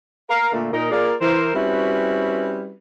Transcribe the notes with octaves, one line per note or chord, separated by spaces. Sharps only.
A#4 F5
A#2 D3 A3 A#3
A#2 D#4 A#4
A#3 F4 G#4 A#4 D5
E3 A#4 C5
G3 C4 C#4 E4 F#4 B4